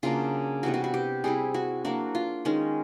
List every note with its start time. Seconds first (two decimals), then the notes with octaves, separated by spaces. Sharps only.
0.03 C#3 F#3 A#3 D4 F4
0.63 C3 E3 G3 B3 F#4
0.74 F#4
0.84 F#4
0.94 G4
1.24 G3 C4 E4 G#4
1.54 F#4
1.85 F#3 A#3 D4 F#4
2.15 F4
2.45 D#3 G#3 C#4